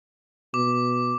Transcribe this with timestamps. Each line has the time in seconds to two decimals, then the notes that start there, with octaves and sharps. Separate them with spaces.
0.54 B2 D6